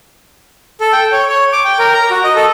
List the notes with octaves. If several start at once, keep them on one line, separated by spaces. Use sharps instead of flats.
A4
G5
C#5
C#5
D6
G5
A#4
A#5
F#4
D#5
A4